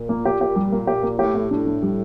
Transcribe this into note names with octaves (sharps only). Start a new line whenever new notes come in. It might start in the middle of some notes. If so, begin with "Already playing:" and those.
Already playing: A#2
A#3
G4
G4
G3
A#3
A#2 G4
A#3
A2 G4
G4
A2 D4
D4
G3